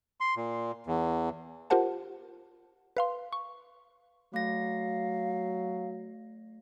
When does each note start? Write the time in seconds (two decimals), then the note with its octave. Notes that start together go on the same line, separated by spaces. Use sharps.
0.20 C6
0.37 A#2
0.87 E2
1.70 F4 G4 A#4 C5 F#5 A5
2.97 B4 F5 C6
3.33 C#6
4.34 F#3 A3 F5 A#6